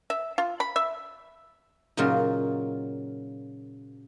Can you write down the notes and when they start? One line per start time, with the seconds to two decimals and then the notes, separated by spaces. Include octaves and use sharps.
0.10 E5
0.38 F4
0.60 B5
0.76 E5
1.97 F#2 A#2 C#3 F#3 D#4 F4